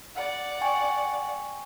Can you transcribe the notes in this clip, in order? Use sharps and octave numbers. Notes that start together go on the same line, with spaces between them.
D5 F#5
G5 G#5 C#6